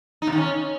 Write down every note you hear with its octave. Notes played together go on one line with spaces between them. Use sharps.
D#4
C3
D#3
C#4